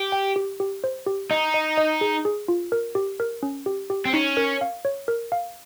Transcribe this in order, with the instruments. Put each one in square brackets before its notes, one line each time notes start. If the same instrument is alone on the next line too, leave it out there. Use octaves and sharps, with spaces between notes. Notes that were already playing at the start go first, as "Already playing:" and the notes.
Already playing: [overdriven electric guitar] G4
[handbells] G5
G4
G4
C5
G4
[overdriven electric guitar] D#4 [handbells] D#5
[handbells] D#5
D#5
G#4
G#4
F4
A#4
G4
A#4
C#4
G4
G4
[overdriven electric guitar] C4
[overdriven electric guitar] C#4 [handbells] D#4
[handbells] A#4
F5
C#5
A#4
F5